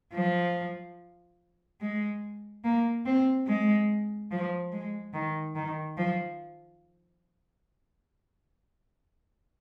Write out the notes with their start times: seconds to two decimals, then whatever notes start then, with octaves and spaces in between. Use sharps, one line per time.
0.14 F3
1.81 G#3
2.65 A#3
3.06 C4
3.48 G#3
4.31 F3
4.72 G#3
5.13 D#3
5.55 D#3
5.98 F3